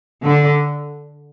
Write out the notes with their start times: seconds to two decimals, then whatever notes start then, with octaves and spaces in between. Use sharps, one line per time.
0.24 D3